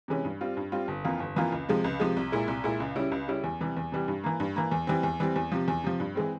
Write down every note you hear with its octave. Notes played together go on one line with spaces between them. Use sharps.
C3 E3 G#3 C#4
G2
G3 C4 F4
G2
G3 C4 F4
G1
F2 E3 A#3 F4
G1
F2 E3 A#3 F4
C#2
C3 F3 G#3
C#2
C3 F3 G#3
C2
A#2 G#3 E4
C2
A#2 G#3 E4
C#2
C#3 G3 C#4 E4
C#2
C#3 G3 C#4 E4
E2
C3 E3 G3
E2
C3 E3 G3
G2
E3 A#3
G2
E3 A#3
E2
E3 G3 C4
E2
E3 G3 C4
E2
C3 F3
E2
C3 F3
G2
E3 G#3 C4